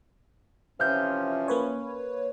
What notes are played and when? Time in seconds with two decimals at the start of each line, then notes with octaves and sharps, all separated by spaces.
0.80 C3 E3 F3 C#4 F6 G6
1.48 A#3 B4 C#5